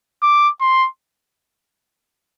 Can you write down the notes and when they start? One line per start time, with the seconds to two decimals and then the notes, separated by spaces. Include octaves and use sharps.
0.23 D6
0.61 C6